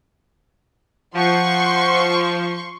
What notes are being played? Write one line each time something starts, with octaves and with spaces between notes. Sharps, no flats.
F3 F#5 C6 C#6